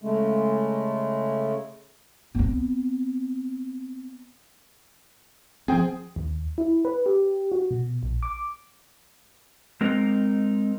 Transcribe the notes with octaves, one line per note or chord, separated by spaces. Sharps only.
C#3 G#3 A3
B3 C4
F3 C4 G#4 G5
D#2
E4
B4
G4
F#4
B2
A#1
D6
G#3 C4 D#4 A#4